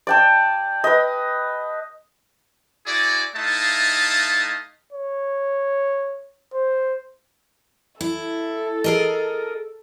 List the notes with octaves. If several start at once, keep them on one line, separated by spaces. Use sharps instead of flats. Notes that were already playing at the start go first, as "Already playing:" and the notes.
D5 G5 A5
B4 D#5
E4 F#4 G#4 D5
A3 D#4 E4 D#5 F5 A5
C#5
C5
E4 A4
G#4 A#4 D#5